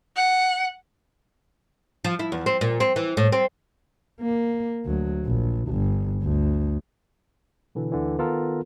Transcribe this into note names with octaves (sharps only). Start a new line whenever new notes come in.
F#5
F3
E4
E2
C4
A#2
C4
E3
A2
C4
A#3
D2 F#3
A#1
G1
D2
B2 D3 E3
D2 D3 E3
D#3 B3 F4 A4 A#4